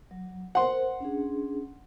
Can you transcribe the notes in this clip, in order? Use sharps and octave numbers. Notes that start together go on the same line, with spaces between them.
F#3
A#4 C5 F#5 C6
C#4 D4 G#4